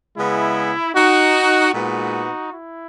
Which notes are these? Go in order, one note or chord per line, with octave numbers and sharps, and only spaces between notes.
C#3 G#3 B3 E4
D#4 F#4
A#2 G#3 B3 D#4 F#4
E4